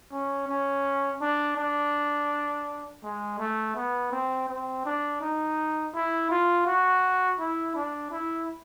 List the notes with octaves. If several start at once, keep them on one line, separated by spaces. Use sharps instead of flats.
C#4
C#4
D4
D4
G#3
A3
B3
C4
C4
D4
D#4
E4
F4
F#4
E4
D4
E4